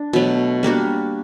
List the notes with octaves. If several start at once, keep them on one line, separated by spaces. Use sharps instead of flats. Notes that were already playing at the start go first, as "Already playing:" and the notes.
Already playing: D4
B2 F#3 A3
G3 A#3 D4 F#4